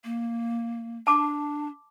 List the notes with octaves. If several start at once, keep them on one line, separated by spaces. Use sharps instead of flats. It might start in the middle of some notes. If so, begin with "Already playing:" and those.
A#3
D4 A5 D6